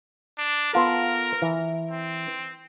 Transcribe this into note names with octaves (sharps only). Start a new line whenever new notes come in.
D4
B3 F4 A4 A#4
E3
C4